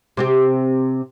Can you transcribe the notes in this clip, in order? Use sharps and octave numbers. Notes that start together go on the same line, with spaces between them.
C3 C4 G4